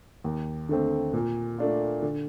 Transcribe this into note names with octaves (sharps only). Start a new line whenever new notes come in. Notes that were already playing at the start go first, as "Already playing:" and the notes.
D#2
D3 A3 C4
A#2
A3 D4 F4
D3